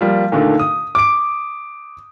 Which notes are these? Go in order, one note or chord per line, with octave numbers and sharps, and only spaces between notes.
F3 G3 A#3
A#2 D3 D#3 A3
D#6
D6 D7